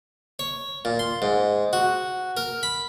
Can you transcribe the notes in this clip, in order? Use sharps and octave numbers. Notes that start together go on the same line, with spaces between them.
C#5
A#2
C6
G#2
F#4
A#4
B5